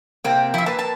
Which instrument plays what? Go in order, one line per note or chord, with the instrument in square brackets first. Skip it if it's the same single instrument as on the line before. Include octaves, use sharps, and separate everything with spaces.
[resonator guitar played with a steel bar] C3 A#3 C4 [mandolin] G5
[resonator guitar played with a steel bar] F3 [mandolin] E4 E5
[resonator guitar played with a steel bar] A#3 B4 [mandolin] A5
[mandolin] A5